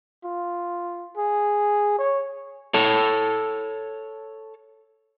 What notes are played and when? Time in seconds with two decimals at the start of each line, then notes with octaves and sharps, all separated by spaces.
0.24 F4
1.17 G#4
1.98 C#5
2.74 A4 C#5 A5